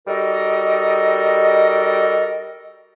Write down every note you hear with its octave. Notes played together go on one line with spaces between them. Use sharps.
G3 D#4 F#4 A4 A#4 D#5